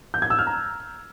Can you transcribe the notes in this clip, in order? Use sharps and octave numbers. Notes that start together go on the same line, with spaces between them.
G6
G#6
E6
F6
A#5